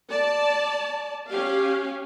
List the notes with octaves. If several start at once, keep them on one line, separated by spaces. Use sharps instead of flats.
D5 A5
C#4 G4 F5